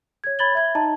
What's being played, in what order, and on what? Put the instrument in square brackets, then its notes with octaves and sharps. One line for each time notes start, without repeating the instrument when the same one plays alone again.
[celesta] C#5 G#6
C#5 B5 G#6 A6 F#7 G7
E5 G#6
D#4 D#5 A5 A#5